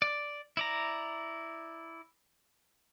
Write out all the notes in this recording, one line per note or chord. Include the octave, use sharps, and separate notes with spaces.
D5
E4 D5 A#5